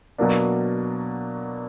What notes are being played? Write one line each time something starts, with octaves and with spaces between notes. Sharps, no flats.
B2 F#3 A#3 D4